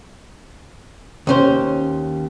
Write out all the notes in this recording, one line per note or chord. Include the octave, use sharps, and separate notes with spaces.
D#2 C#4 C5